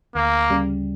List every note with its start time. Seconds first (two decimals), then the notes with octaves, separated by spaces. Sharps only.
0.15 D2 A#3
0.50 C#3 G3